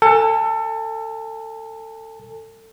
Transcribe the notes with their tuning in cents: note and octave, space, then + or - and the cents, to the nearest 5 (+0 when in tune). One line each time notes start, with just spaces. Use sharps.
A4 +25 G#5 -15